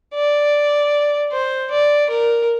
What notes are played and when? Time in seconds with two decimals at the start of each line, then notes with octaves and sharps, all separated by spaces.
0.14 D5
1.32 C5
1.71 D5
2.10 A#4